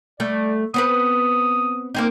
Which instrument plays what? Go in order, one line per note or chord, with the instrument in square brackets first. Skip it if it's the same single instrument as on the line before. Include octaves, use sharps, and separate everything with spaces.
[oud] G3 A3 [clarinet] D5
[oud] B3 C4 B4 [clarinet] D#6
[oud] A#3 C4 D#4